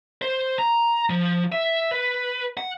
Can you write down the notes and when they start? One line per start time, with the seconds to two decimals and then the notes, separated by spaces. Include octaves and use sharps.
0.22 C5
0.59 A#5
1.10 F3
1.52 E5
1.91 B4
2.57 F#5